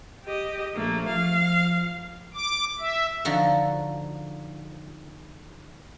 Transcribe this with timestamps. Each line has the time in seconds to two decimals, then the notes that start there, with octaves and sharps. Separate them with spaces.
0.25 G4 D#5
0.75 A#1 A3 A#3
1.08 F3 F5
2.34 D6
2.79 E5
3.25 D3 F3 D#4 F#4